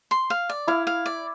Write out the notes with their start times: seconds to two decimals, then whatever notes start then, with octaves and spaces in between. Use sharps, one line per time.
0.11 C6
0.30 F5
0.49 D5
0.68 E4 F5
0.87 F5
1.06 D5